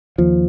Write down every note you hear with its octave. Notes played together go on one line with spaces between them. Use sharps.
D#2 F3